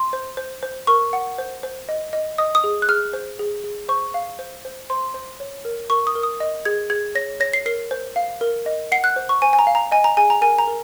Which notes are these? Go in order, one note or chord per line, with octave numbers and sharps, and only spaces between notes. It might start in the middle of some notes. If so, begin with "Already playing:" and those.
Already playing: C6
C5
C5
C5
A#4 C#6
F#5
C5
C5
D#5
D#5
D#5 D#6
D#6
G#4
F#6
G#4 F6
C5
G#4
G#4
C5 C#6
F5
C5
C5
C5 C6
C5
C#5
A#4
A#4 C#6
D#6
A#4
D#6
D#5
G#4 G#6
G#4 G#6
C#5 A#6
C#5 A#6
C7
A#4 C7
C5
F5
A#4
D#5
F#5 C7
F#6
C5
C#6
C5 G#5
G#5
A#5
F5
A#5
D#5 G#5
A#5
G#4 G#5
A#5
A#4 G#5
A#5
A#4